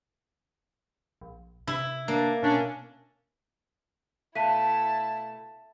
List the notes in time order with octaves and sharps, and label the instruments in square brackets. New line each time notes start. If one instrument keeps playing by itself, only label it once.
[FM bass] A#1
[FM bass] C3 [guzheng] E4
[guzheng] A#3 [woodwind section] D4
[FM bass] B2 [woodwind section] C#4 D4
[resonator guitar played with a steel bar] B2 A3 [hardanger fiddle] E4 A5 [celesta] F5 B6 D#7